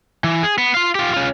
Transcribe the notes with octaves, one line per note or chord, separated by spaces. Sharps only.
E3
G#4
B3
F4 F5
F4 G4
C#4 F4